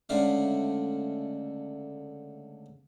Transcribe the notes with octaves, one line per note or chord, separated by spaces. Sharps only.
C#2 D3 A3 F5